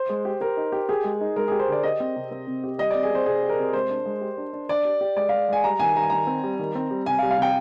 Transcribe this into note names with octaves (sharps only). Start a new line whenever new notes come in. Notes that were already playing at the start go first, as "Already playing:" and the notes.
Already playing: C5
G#3
G4
G4 A#4
D#4
G4
G4 G#4
G#3
D#4
G#3 A#4
G4 G#4
C5
D3 D5
G4 D#5
C4
C3
C4
C3
G4
G3 D#5
C4 D5
G#4
C4 C5
C3 G#4
G4
A#4
C3
G#3 C5
D4
G#3
G4
D4
D4
D4 D5
G4
G4
G#3 D5
G#3 F5
G#3 G#5
G3 A#5
D#3 G#5
G3 A#5
G#5
D#3 A#5
C4
G3
D#3
C4
G3
C3 G#5
F5
G3
F5
C3 G5